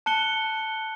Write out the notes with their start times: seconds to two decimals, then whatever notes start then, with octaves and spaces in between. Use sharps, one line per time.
0.06 A5 F#6 C#7 G7